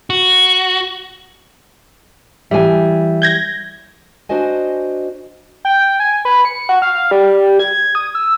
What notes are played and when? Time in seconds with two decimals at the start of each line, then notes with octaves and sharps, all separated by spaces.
0.10 F#4
2.51 E3 G3 E5 G#5
3.22 G6 G#6 A#6
4.29 D4 F#4 C5 D#5 G#5
5.65 G5
6.00 G#5
6.25 B4
6.45 C#7
6.69 F#4
6.82 F5
7.11 G3
7.59 G#6
7.95 D#6
8.15 E6